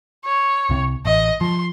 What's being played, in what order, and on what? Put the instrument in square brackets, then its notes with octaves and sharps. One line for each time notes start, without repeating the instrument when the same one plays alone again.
[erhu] C#5
[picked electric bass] C2 C3
[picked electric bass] A1 [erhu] D#5
[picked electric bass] F3 [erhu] C6